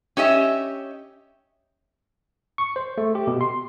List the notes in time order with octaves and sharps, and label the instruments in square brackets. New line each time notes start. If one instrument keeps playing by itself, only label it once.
[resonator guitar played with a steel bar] C#4 G4 D#5 E5
[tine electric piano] C#6
C5
A3
G4
B2
C6